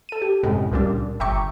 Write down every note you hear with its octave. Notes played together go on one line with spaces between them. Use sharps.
A4 D#7
G4
F#2 A2 C3 G#3 A3
C#2 A#2 G3 D4
G1 E5 G5 A#5 C#6 D6